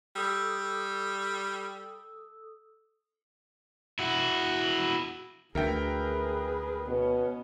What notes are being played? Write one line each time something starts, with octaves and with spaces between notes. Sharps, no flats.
G3 A4 D#6 E6
E4 F#4
D2 G#4 A#4 B4 E5 G5
B2 B3 C#4